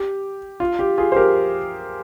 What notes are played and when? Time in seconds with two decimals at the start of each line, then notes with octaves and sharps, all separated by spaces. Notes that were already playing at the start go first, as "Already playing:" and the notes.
Already playing: G4
0.60 F4
0.79 G4
0.98 F4 G#4
1.12 C5
1.16 G4 A#4